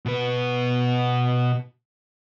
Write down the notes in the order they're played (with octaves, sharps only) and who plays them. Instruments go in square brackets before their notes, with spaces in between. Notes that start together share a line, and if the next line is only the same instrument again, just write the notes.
[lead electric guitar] B2 B4